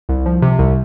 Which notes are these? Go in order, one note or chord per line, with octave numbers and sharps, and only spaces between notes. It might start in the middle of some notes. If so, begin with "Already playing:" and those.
C2
F3
C3
C2